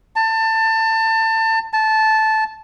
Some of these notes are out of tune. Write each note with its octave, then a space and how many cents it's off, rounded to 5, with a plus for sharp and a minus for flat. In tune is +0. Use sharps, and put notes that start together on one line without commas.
A5 +25
A5 -10